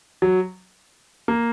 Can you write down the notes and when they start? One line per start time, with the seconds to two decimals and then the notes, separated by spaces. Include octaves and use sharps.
0.22 F#3
1.28 A#3